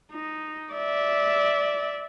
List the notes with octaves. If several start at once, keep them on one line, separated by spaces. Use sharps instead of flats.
D#4
D5 E5